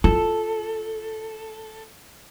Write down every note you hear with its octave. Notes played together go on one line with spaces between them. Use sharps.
F4 A4